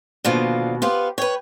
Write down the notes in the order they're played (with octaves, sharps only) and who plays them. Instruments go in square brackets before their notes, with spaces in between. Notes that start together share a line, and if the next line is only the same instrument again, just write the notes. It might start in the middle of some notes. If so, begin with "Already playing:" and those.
[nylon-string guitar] D#2 B2 [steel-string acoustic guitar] D3 F3 F4
[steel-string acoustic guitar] B3 F4 B4 [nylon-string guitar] G4 C5
[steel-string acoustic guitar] B4 C#5 [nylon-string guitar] G5